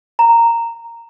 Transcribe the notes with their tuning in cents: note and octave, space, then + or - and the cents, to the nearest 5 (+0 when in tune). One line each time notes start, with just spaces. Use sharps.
A#5 -10